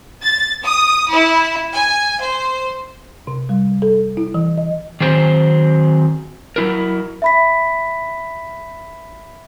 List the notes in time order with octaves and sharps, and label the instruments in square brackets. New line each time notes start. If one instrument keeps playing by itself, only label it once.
[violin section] A6
D#6
E4
G#5
C5
[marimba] C3
G3
A4
E4
E3
D#5
[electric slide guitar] D#3 F#3 C4 G#4 C5
F#3 E4 A#4
[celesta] E5 B5 B6